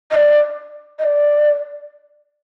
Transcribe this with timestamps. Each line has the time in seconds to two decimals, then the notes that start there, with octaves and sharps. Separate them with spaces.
0.11 D#5
0.15 D5
0.99 D#5
1.04 D5